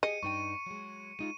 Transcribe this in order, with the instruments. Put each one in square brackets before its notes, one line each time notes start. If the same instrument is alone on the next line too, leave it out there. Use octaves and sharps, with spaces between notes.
[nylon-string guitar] G4 G#4 [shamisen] D#5 [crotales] C#7 D#7
[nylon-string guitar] G2 D#4 G5 [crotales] C#6 D#7
[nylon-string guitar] F#3 G#3
[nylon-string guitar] G#3 D#4 F4 [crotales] D#7